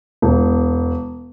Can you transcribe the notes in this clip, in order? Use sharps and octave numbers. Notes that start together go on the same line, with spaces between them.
E1